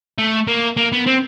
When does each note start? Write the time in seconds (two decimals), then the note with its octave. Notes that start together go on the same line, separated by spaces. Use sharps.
0.18 A3
0.47 A#3
0.77 A#3
0.92 B3
1.06 C4